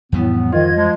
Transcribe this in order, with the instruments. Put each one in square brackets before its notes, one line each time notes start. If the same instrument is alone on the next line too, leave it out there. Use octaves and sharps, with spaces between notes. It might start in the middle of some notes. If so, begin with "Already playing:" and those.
[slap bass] F2 E3 G3 [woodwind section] A2 B3
[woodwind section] G#2 D#3 [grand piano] F4 [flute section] D#5 G#6
[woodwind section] F3 G#3